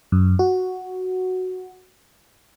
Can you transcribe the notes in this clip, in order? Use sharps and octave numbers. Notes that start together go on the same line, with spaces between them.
F#2
F#4